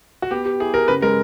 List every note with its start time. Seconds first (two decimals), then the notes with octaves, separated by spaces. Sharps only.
0.22 F#4
0.31 B3 G4
0.45 G4
0.60 E4 G#4
0.74 G4 A#4
0.88 C#3 B4
1.02 G#3 A#4